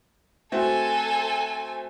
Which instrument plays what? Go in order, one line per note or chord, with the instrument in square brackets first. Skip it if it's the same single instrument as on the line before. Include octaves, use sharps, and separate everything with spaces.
[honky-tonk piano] A3 C4 F#4 [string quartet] A4 G#5